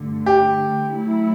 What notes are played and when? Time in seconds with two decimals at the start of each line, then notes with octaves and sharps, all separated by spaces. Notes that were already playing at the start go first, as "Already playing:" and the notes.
Already playing: G2 D3 A3
0.26 G4
0.91 F#3 A3 E4